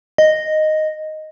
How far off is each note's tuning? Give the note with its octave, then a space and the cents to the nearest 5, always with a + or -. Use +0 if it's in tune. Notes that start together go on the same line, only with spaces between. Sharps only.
D#5 -5